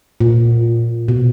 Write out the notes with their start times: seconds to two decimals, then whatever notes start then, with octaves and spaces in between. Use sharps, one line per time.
0.21 A#2
1.08 B2